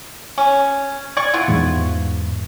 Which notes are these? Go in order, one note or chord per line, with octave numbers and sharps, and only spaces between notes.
C#4
D5 C#6 G#6
B3 E4 F4
E2 G#2